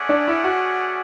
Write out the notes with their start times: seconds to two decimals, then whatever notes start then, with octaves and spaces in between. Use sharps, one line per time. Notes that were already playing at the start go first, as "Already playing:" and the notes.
Already playing: A3 C#4 G#4 D5 F#5
0.09 D4
0.27 E4
0.44 F#4